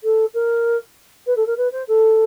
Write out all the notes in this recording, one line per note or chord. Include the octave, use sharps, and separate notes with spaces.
A4
A#4
B4
A4
A#4
B4
C5
A4